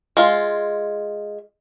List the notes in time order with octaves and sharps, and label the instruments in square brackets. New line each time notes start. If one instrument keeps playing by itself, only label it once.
[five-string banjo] G#3 F4